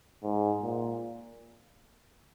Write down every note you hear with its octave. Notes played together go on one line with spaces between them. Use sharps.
G#2
A#2